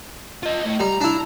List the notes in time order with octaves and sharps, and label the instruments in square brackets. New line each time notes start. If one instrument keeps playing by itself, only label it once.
[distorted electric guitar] F4 D#5
A2
[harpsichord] G3 [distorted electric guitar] A#5
[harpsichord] D4 E4